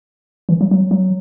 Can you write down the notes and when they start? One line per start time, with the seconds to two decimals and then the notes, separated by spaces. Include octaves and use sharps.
0.49 E3
0.61 F#3
0.71 F#3
0.91 F#3